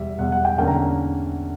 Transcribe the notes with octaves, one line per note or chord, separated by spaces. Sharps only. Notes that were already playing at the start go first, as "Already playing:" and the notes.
Already playing: E2 B2 G3 E5
E2 B2 G3 F#5
F#5
G5
E2 D3 A#3 C#4 G5
A#5